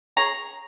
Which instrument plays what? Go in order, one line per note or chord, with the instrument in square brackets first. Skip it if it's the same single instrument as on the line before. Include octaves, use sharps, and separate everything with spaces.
[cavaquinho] G#4 C#5 A#5